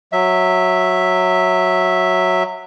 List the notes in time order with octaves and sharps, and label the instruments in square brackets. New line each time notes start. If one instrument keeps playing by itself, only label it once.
[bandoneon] F#3 E5